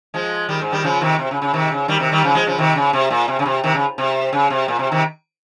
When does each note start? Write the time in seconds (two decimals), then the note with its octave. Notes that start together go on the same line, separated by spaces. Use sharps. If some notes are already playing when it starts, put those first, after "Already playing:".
0.14 F3 G#3
0.49 D#3 G3
0.61 G#2
0.72 D#3 G3
0.84 C#3 F3
1.01 C3 D#3
1.19 C3
1.31 C#3
1.42 C#3
1.54 C3 D#3
1.71 C#3
1.88 D#3 G3
2.00 C3 D#3
2.12 D#3 G3
2.23 C#3 F3
2.35 F3 G#3
2.46 C#3 F3
2.59 C3 D#3
2.76 C#3
2.93 C3
3.10 A#2
3.28 C3
3.39 C#3
3.46 C3
3.64 C3 D#3
3.75 C#3
3.98 C3
4.33 C#3
4.50 C3
4.68 A#2
4.79 C3
4.92 C3 D#3